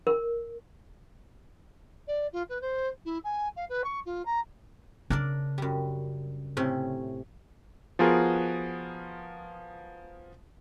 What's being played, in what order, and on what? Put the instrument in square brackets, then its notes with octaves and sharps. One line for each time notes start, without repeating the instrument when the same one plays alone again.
[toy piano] A#4
[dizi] D5
F4
B4
C5
E4
G#5
F5
B4
C#6
F4
A#5
[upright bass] C#3 [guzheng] D4 A#4 D5
[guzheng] F#2 G3
A2 C3 C#4
[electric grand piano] F3 B3 F4 F#4 G#4 A#4